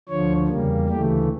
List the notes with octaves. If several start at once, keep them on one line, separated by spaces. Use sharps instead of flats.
D2 D3 F3 C#5
E2 C#3 G3 A#3
D2 C#3 E3 A3 G4